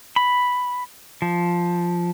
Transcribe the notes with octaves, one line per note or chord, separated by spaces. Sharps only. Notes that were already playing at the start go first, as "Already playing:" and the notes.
B5
F3